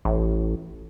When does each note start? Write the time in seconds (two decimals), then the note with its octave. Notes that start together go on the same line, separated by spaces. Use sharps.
0.05 A1